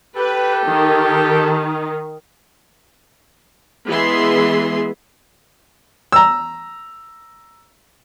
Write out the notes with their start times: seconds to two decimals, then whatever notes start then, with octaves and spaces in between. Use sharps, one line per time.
0.16 G4 A4 B4
0.66 D#3
3.87 E3 G#3 B3 G#4 E5 C6
6.12 A#5 E6